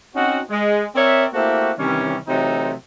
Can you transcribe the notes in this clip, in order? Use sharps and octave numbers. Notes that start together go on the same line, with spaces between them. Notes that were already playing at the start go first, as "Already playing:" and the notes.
C4 C#4 D#4 F#4
G#3
C4 A#4 C#5 D5 E5
A3 A#3 C4 E4 F#4 G4
C3 D#3 E3 G3 C#4
C3 E3 F#3 A3 C4 D#4